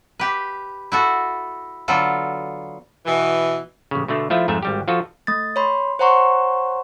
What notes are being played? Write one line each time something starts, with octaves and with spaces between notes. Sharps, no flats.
G4 B4
E4 F#4 A4
D3 F#3 B3 F4 A4
B2 E3
A1 C#3
B2 D3 A3
F3 A3 E4 F4
F2 G#2 A3 E5
G#1 G3 G4
F3 F4 F#4 A4
A3 A6
C#5 B5 C6
C5 C#5 F#5 A#5 C6 C#6